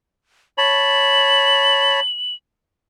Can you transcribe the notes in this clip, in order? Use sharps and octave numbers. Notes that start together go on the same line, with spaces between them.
C#5 A5 B5 F#7